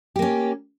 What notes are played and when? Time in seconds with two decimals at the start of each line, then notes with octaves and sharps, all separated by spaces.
0.16 G4
0.19 A#3
0.22 C#4